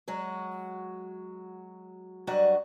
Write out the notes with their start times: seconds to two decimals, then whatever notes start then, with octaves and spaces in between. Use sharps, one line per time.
0.08 F#3 G#3 F#4
2.27 G2 F#3 F#4 D5 D#5